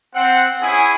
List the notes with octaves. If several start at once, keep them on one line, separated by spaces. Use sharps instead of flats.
C4 F#5
C#4 E4 G#4 G#5